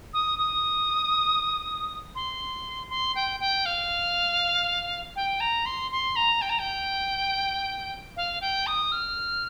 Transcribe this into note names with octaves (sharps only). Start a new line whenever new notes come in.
D#6
D#6
C6
C6
G5
G5
F5
G5
A#5
C6
C6
A#5
G5
A#5
G5
F5
G5
D#6
F6